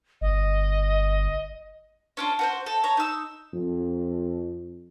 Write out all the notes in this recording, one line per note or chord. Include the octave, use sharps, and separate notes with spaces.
G1 D#5
C#4 D4 F4
F#4 B4 C5
A4
C#5 A#5
D#4 E6
F2